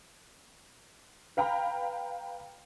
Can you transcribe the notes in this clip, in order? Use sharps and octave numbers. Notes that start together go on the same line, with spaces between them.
B4 F5 G5 A#5 B5